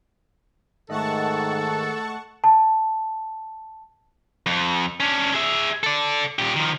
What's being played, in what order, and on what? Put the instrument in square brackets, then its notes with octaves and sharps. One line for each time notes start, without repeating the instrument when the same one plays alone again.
[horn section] G#2 D#3 [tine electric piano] A3 D#5 [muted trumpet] A4 [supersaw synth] F#5 A5 C#6
[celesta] A5
[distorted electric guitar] F2
C#4 D4
G#4 E5
A4 D5
A#2 G4
D#3 F3